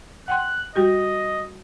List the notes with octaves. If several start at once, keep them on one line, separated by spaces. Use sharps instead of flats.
F#5 G5 C6 F#6
G3 F#4 G4 D#5